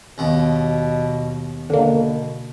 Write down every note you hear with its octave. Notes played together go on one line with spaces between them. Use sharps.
D#2 B2 B3
B2 D3 A#3